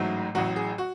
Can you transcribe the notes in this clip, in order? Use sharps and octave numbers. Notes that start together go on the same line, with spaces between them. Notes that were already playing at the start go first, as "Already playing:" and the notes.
Already playing: A1 G#2 F#3 A3
A1 A2 F#3 F#4
G#4
F#4